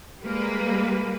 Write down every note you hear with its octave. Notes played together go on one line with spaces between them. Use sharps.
G3 G#3 A#3 B4